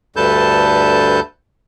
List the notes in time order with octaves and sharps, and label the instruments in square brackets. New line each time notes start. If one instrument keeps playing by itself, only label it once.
[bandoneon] D2 G2 A4 B4 A5 G6